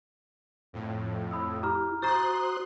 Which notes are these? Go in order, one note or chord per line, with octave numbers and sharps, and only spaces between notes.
F2 A2
B5 D#6 E6
E4 G4 A#5 F6
F#4 C5 A#5 C6 D#6 F#6 A6